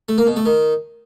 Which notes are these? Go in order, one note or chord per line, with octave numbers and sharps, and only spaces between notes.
A3
A#3
B2
A3
D#3